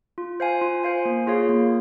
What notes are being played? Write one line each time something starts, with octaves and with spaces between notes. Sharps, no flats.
F4
C5 F5 G#5
F4
C5 F5 G#5
A#3
F4 G#4 C#5 F5
A#3